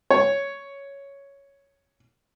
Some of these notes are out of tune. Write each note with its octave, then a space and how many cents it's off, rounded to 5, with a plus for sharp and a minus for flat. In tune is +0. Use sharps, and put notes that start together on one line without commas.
C#5 +5